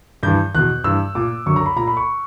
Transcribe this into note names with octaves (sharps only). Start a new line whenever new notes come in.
G2 E3 G6
E2 B2 F#6
G2 E3 E6
A#2 D6
F#2 D3 C#6
A#5
B5
A#2 A#5
B5
C#6